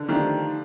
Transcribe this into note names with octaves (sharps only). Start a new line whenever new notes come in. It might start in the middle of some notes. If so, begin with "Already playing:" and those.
Already playing: D3
D#3 F3 A3 D4 G4